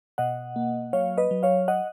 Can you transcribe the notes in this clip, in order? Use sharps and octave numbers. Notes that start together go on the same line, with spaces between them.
B2 D#5 F#5
A#3
F#3 C#5 F5
B4 D#5
F#3
C#5 F5
D#5 F#5